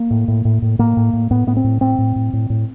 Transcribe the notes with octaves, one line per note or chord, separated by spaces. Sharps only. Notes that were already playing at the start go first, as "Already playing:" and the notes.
Already playing: A#3
A2
A2
A2
A2
A2 A#3
A2
A2
A2 B3
A2 B3
C4
A2
A2 C4
A2
A2
A2
A2